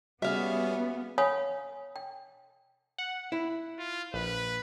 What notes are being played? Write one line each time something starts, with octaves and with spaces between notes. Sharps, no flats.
G3 B3 C#4 F#4 G#4 E5 F5
C#5 F5 F#5 G#5 B5 D#6
G5
F#5
E4
F4
A#1 B4